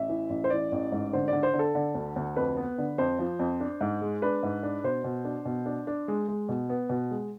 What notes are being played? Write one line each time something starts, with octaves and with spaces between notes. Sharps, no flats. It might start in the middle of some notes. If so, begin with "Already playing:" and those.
Already playing: A1 E5
E3
A1
C5
E3 D5
A1
G#2
D3 C5
D3 D5
C5
D3
A4
D3
D2
D2
F2 B4
B3
D3
F2 C5
F3
F2
D4
G#2
G#3
D4 B4
G#2
D4
B2 C5
B2
D4
B2
D4
D4
G#3
G#3
B2
B3
B2
G#3